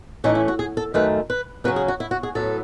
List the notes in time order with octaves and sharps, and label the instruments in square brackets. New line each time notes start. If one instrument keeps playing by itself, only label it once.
[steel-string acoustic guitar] A2 E3 A3 C#4 D#4
E4
F#4
G#4
A4
F#2 D#3 A3 B4
B4
C#3 F#3 C#4 B4
G#4
F#4
E4
F#4
G#4
A2 F#3 B3 A4